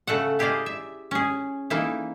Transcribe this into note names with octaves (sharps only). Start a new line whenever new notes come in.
C#3 A3 A4 F#5
E4 G4 G#4 D5 D#5 F5
E5
C#4 G#4
E3 A#3 D#4 E4